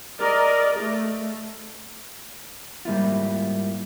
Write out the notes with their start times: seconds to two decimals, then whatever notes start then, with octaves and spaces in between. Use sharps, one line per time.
0.19 A#4 D5 D#5
0.78 A3
2.85 G#2 G3 A#3 E4 F4